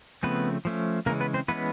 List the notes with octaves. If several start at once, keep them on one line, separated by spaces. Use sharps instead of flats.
C#3 F3 A3 B3 C4 B4
F3 A3 C#4
C#3 E3 G#3 A#3 C#4 A#4
B3 B4
C4 C5
E3 G#3 B3 C#4 B4